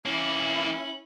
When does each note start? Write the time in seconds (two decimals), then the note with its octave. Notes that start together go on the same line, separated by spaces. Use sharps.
0.06 E3 A#3 C#4 E4 F#7